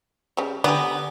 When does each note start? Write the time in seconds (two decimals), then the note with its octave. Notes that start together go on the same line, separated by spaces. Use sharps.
0.37 C#3 G3
0.64 D3 B3 G4 D5 G#5 A#5